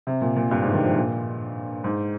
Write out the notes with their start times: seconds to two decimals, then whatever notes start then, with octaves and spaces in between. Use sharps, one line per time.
0.07 C3
0.21 A#2
0.36 A#2
0.51 G2
0.62 G#2
0.74 D#3
0.84 F3
0.96 A#2
1.84 G#2